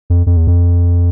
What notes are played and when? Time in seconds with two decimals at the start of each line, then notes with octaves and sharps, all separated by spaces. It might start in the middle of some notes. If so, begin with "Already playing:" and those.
0.10 F2
0.27 F2
0.37 E2
0.47 F2